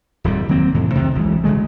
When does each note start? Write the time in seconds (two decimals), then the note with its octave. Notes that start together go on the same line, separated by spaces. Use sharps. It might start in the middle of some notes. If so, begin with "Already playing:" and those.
0.24 D1 F2 G3
0.49 D#3 F#3 A#3 C4
0.74 F2 A2 C3 E3
0.94 C#2 C3 D#3
1.15 B1 E3 G#3
1.44 F#1 D3 G#3 A3